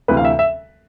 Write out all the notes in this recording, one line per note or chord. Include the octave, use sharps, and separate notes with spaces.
D2 C3 E3 B4
F5
E5
E5